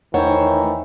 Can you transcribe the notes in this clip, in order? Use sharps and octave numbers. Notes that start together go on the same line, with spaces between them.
E2 D#3 E3 A3 C5 C#5